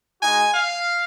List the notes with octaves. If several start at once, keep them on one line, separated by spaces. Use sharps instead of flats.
G#3 D#4 F#4 G#5
F5